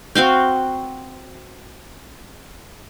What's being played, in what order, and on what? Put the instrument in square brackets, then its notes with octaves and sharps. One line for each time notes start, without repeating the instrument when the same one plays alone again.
[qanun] C4 F#4 F5 G5